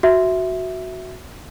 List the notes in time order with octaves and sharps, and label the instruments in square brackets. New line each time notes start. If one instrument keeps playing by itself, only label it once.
[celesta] F#4 E5